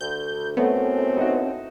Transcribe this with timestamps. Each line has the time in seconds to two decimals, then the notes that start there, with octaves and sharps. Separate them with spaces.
0.01 D2 G6
0.57 F#2 A2 A3 B3 C4
1.17 D#4 E4 F#4